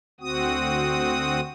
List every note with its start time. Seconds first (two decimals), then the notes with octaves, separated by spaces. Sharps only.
0.21 D2 C4 F#4 D#6